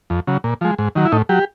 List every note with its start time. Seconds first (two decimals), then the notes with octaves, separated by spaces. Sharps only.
0.10 F2
0.27 C#3 F#3
0.44 A#2
0.61 F3 G#3
0.78 G#2
0.95 D#3 F#3
1.05 E4
1.12 A2 D#4
1.29 F#3 G4